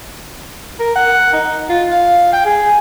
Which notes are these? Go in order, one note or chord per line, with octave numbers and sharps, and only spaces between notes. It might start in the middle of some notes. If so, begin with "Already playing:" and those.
A#4
F#5
D#4
F4
F5
G5
G#4